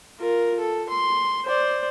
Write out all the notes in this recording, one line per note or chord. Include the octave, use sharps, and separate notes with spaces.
F4 A#4
A4
C6
C5 D5